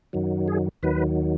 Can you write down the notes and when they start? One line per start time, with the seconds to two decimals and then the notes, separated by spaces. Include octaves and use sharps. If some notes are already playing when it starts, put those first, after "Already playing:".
0.13 F#2 D#3 F#3
0.48 G#4
0.83 D#2 D#3 F#3 B4